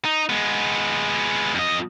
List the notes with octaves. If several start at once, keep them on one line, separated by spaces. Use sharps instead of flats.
D#4
G#3 B3
F2 D#5